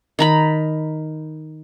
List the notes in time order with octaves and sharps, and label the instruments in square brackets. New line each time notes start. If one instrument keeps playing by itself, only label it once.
[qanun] D#3 A#5 B5